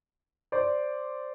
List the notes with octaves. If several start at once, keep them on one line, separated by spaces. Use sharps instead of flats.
C5 D5